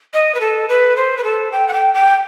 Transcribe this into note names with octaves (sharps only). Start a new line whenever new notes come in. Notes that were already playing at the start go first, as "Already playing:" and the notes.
D#5
B4
A4
B4
C5
B4
A4
G5
F#5
G5
G5